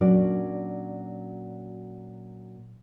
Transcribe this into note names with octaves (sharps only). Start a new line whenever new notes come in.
A#2 F#3 C#4 D4 F#4 D5